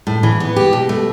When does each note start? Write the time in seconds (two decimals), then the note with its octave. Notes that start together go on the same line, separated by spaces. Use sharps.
0.07 A2
0.23 E3
0.40 B3
0.56 G4
0.73 B2
0.89 A3